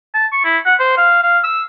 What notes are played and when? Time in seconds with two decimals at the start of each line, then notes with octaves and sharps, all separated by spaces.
0.14 A5
0.32 C#6
0.44 E4
0.66 F#5
0.79 C5
0.97 F5
1.23 F5
1.43 E6